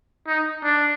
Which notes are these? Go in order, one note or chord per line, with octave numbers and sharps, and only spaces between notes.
D#4
D4